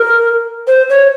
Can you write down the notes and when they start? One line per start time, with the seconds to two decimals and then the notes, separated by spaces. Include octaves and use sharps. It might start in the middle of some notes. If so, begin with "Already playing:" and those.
Already playing: A#4
0.67 C5
0.90 C#5